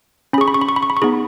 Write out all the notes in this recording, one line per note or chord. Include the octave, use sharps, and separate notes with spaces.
C#4 G#4 B5 C#6
B5
C#6
B5
C#6
B5
C#6
B5
C#6
B3 D#4 G#4 B5